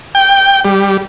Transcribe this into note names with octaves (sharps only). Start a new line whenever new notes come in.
G5
G3